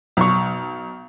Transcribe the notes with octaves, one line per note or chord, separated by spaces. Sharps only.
B1 C#6